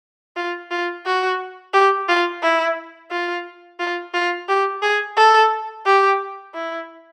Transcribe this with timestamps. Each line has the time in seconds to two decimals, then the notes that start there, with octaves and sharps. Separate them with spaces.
0.36 F4
0.71 F4
1.06 F#4
1.73 G4
2.09 F4
2.43 E4
3.11 F4
3.79 F4
4.14 F4
4.48 G4
4.82 G#4
5.17 A4
5.85 G4
6.54 E4